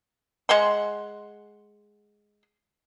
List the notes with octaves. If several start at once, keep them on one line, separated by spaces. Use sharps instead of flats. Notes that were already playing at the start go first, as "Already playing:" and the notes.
G#3 F#5 C6